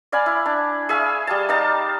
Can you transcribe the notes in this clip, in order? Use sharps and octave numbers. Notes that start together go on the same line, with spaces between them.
D5 F5 G#5 B5
E4
D4
G#4 E5 F5 C#6
G3 F5 A5
D#4 D5 F5 A5